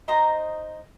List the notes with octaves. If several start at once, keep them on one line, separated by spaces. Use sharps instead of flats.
D#4 C5 D#5 A#5